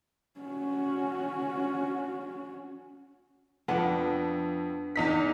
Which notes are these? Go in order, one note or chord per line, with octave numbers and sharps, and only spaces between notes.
C#4 F#4
F2 B3 D4
E2 D#4 B6